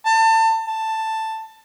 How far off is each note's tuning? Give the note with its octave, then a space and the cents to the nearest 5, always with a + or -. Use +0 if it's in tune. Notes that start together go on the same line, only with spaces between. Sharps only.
A5 +30
A5 +10